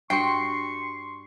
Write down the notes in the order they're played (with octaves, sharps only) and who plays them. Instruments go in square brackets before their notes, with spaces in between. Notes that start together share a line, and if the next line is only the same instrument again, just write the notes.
[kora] G2 F#4 F#5 [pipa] G5 [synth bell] C6 C7 [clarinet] C#6